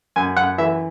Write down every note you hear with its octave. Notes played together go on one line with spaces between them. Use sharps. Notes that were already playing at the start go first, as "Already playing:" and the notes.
F#2 G#5
F#2 F#5
E3 E5